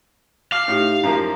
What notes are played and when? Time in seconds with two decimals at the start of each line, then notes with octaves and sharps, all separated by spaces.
0.52 F5 D6 F6
0.68 A2 D#4 E4 G4
1.03 F#2 F3 A#3